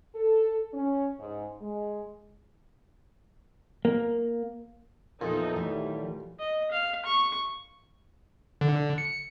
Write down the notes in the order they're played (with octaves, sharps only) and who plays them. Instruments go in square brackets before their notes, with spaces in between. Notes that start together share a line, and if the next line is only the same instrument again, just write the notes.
[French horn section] A4
C#4
G#2
G#3
[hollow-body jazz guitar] A#3
[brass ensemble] E2 [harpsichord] A#2 [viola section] F3 D#4 A4
[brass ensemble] D#3 F#3 A3 [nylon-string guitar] E3 [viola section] G3
[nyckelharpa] D#5
F5
C#6
[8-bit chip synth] D3
C#7